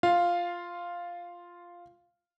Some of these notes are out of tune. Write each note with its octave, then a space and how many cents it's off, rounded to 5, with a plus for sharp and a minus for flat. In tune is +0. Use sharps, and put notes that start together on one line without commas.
F4 +0 F5 +0